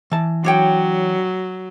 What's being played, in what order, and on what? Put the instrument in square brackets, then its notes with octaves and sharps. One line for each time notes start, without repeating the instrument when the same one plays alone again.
[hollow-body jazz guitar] E3 A5
[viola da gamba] F#3 [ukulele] D4 C#5 G5